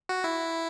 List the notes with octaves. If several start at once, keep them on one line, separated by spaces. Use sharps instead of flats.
F#4
E4